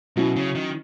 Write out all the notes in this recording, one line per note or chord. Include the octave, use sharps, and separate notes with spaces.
B2 F#3 C#4 E4
C#3
D#3